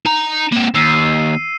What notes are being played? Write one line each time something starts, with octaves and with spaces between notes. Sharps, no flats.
D#4 A#5
A#3 C4
D#2 E6 C7 D#7